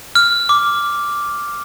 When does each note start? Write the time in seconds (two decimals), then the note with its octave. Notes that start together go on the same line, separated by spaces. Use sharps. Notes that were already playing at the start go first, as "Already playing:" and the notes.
0.15 F6
0.49 D6